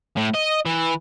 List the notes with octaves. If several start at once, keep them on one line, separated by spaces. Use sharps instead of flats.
A2
D#5
E3